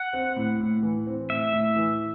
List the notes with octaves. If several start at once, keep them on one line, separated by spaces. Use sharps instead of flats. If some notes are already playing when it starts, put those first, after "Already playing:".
Already playing: F#5
C4
A2
A2
E3
C4
A2 E5
A2
E3